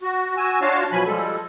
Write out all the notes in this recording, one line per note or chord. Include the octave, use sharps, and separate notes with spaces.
F#4
F#4 G#5 E6
D4 F4 F#4 C#5 F5 A5
B2 F3 F#3 G#5 B5
F3 G3 G#3 A4